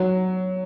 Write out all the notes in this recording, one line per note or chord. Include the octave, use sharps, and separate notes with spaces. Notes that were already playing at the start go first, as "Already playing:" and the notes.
Already playing: F#3